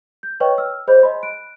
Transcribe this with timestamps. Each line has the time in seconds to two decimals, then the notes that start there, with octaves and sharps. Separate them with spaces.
0.23 G6
0.40 B4 C#5 D#5 G5 C#6
0.58 E6 F6
0.87 G#4 C5 C#5 D#5 B5 G6
1.02 D#5 G#5 B5 C6
1.23 F#6 D7